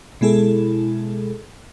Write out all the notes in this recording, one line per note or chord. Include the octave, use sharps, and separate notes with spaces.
B2 G#3 E4 G#4 A4